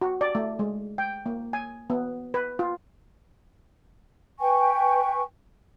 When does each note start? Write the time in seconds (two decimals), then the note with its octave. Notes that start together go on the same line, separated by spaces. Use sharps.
0.02 F#4
0.21 D5
0.35 A3
0.59 G#3
0.98 G5
1.26 A#3
1.53 G#5
1.90 B3
2.34 B4
2.59 F4
4.40 B4 G5 G#5 C#6